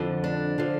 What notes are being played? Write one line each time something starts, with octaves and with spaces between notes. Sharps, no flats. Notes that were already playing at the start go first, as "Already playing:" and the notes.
Already playing: F2 D3 F3
D4
D3 F3